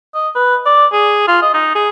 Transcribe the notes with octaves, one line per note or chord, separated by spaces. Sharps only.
D#5
B4
D5
G#4
F4
D#5
D#4
G#4